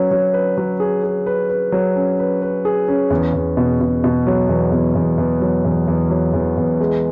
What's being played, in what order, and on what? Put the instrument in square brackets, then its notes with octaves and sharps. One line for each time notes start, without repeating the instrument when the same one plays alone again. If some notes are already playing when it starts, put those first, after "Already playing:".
Already playing: [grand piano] F#3 C#4 B4
F#3
B4
F#3
G#4
G#4
B4
B4
F#3
C#4
B4
B4
G#4
C#4
E2
E2
B2
B2
B2
F#3
E2
E2
E2
E2
F#3
E2
E2
F#3
E2
E2
G#3